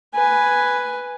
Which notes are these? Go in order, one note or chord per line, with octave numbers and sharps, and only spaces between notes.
B4 G#5